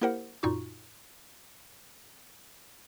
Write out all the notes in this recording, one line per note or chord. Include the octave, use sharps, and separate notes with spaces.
A#3 E4 G4 A#4 C5 F#5
F#2 A#2 D#4 F4 F#4 C#6